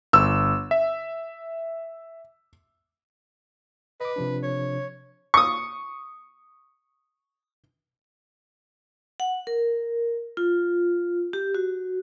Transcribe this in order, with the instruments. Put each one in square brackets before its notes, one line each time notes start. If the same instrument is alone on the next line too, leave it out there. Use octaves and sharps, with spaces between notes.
[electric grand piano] G1 [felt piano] E6
[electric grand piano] E5
[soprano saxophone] B4 [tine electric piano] D#5 D6
[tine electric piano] C3 F3 D4
[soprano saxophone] C#5
[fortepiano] C#6 D#6
[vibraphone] F#5
A#4
F4
G4
F#4